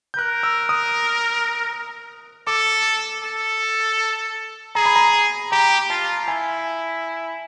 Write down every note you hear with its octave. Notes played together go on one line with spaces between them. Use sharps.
G6
A#4 F#6
E6
D#6
A4 D6
A4
G#4 A#5
B5
A#5
G4 A#5
F4 A5
E4 G#5